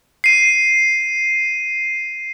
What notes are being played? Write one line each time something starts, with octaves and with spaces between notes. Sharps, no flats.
C7 D#7